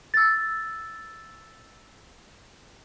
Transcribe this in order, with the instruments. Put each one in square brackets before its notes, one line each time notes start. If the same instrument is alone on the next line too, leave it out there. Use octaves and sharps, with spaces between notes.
[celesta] E6 A6